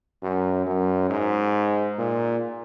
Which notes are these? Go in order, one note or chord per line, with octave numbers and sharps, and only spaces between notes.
F#2
F#2
G#2
A#2